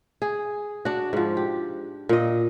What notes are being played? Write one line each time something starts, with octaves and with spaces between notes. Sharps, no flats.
G#4
D4 F#4
G#2 F3
G4
A#2 D#5